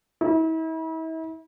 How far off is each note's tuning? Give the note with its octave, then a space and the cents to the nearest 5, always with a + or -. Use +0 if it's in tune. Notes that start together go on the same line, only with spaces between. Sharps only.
E4 -40